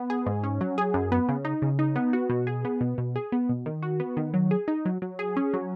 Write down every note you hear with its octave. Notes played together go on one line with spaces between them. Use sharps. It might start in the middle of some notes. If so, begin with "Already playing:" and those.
Already playing: B3
G#4
G#2
C#4
F#3
G#4
F#2
B3
C#3
D#4
C#3
D#4
B3
F#4
B2
G#4
B3
B2
B2
G#4
B3
B2
D#3
F#4
B3
D#3
F#3
G#4
D#4
F#3
F#3
G#4
C#4
F#3